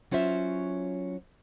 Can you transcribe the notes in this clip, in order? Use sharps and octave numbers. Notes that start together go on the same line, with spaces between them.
F#3 C#4 F4 C5 E5